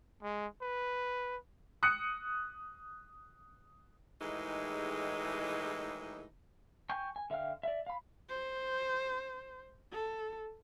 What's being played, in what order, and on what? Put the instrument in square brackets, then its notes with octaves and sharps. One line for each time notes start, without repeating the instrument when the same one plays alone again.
[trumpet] G#3
B4
[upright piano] D#6 F#6 C#7
[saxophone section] D#2 A2 E3 G#3 D#4 G#4
[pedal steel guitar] G5 G#5 C#6 G6
G#5
D3 E5 F5 G5 F6
D5 E5
F5 B5
[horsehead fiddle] C5
A4